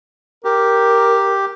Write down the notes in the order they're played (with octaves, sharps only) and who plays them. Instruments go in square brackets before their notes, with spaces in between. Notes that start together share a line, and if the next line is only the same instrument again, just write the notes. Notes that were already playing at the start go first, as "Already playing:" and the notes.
[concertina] G4 [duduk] A#4